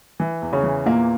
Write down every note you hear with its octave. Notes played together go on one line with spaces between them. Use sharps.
E3
E2
C#3 C#4
E3
E2 A#2 A#3